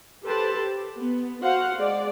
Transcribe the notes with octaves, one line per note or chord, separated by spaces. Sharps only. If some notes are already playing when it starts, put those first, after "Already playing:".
G4 A4 B4 C5 A5
G4
B3
F#4 C5 F5 F#5
G#3 D5